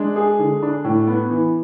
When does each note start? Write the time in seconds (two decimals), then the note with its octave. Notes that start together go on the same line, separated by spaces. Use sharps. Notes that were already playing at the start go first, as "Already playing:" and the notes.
Already playing: G#3 D4
0.16 G#4
0.39 D3
0.62 D4
0.84 A2
1.07 B3
1.30 E3